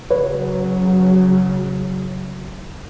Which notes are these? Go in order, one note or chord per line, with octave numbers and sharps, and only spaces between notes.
C#3 F#3 B4 C#5